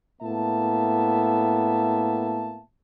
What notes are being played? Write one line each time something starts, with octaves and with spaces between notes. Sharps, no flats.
A2 A#3 B3 E5 A5